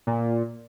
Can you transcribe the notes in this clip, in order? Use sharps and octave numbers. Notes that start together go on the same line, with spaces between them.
A#2